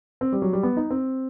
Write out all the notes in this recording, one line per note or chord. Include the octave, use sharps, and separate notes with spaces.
C4
G3
F#3
G3
B3
D#4
C4